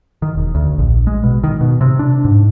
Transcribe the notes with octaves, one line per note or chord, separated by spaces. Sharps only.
D#3
E1
D2
A#1
G#3
B2
D#3
B2
C3
D4
G#2